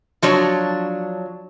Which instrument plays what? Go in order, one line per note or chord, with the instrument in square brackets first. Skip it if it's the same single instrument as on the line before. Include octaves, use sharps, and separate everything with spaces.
[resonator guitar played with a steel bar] F3 F#3 D4 C#5